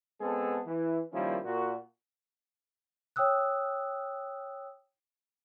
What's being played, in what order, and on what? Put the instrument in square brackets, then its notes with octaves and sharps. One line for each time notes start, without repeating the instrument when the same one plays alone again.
[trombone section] G#3 B3 C4 G#4 A4
E3
D#3 F3 G3 A#3 C#4 E4
A#2 F#4
[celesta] C#5 G5 D#6 E6 F#6